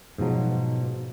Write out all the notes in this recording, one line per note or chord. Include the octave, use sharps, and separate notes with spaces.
G#2 B2 F3 F#3